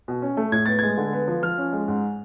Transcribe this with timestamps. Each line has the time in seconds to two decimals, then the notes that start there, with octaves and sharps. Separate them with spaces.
0.08 B2
0.22 C#4
0.37 A3
0.52 A2 G#6
0.66 B3 A6
0.79 G#3 G#6
0.97 D3
1.13 B3
1.28 F3
1.43 F3 F6
1.58 C#4
1.73 G#3
1.88 G#2